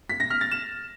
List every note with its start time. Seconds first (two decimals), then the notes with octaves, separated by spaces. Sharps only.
0.09 B6
0.20 A#6
0.30 F6
0.41 A6
0.51 E7